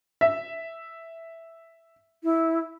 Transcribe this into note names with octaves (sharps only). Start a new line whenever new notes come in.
E5
E4